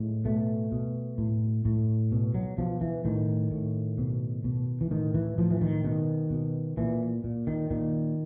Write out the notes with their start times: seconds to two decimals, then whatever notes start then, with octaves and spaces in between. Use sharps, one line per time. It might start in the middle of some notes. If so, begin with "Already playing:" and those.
Already playing: A2 G#3
0.25 B2 A3
0.72 B2
1.18 A2
1.65 A2
2.12 B2
2.35 F#3
2.58 B2 F3
2.81 E3
3.05 A2 D#3
3.51 A2
3.98 B2
4.44 B2
4.81 E3
4.91 A2 D#3
5.14 E3
5.38 A2 F3
5.51 E3
5.61 D#3
5.84 B2 D#3
6.30 B2
6.77 A#2 E3
7.24 A#2
7.47 D#3
7.71 A#2 D#3